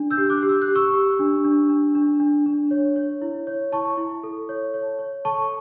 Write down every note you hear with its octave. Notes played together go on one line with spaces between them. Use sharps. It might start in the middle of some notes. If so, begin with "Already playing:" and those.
Already playing: D4
E6 G6
G4
D6 F#6
G4
E6
F#6
G4
C#6 E6
G4
D4
D4
D4
D4
D4
D4
C#5
C#5
E4
C#5
E4 A5 C#6
E4
A4
C#5
C#5
C#5
A4 A5 C#6